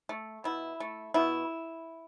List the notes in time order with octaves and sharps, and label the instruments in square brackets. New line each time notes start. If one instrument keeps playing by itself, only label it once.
[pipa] A3
B2 E4
A3
B2 E4